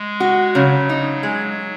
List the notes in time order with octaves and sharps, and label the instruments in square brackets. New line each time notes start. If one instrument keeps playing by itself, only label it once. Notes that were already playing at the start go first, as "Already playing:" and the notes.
Already playing: [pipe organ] G#3
[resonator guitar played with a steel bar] F#4
[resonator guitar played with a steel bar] C#3 [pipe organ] F#3
[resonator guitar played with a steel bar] D#4
G#3